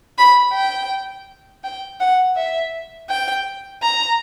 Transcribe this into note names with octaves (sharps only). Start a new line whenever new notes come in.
B5
G5
G5
F#5
E5
G5
A#5